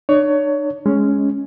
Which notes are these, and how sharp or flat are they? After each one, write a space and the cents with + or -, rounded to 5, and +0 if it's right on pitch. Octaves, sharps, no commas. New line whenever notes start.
D4 +45 C#5 +20
G#3 +0 C#4 +5